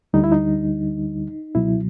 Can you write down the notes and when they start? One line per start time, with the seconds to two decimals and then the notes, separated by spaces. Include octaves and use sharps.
0.13 D2 D3 G3 D#4
0.24 E4
0.32 D#4
1.55 C#2 B2 F#3 E4